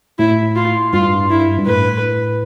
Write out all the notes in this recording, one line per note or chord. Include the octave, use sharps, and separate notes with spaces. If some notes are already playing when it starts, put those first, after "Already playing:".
A2 E4
F4
G2 F4
E4
G2
A2 B4